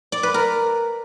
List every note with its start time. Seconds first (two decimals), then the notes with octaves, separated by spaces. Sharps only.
0.12 D5
0.23 B4
0.34 A#4